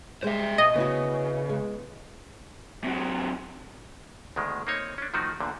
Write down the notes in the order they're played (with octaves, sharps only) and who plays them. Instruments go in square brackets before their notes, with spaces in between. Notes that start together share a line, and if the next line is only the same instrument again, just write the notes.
[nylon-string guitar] G3 G#3 [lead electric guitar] C5 E5
[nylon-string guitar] B2 [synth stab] D#5
[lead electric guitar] C#3 [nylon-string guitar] B3 E4 F#4
[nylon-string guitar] G#3
[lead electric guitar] C3 F#3
[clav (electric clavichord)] D2 B2 D#3 G#3
A#3 C4 D#4 C#5
C#4 D4
D#3 F3 A3 D#4 F#4
E2 A#2 D3